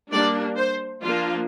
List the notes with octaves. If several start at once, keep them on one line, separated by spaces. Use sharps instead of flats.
G3 A#3 D4 D5
C5
F3 A#3 D4 F4